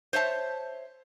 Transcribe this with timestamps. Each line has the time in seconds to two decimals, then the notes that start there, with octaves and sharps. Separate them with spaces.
0.13 C5 C#5 E5 A5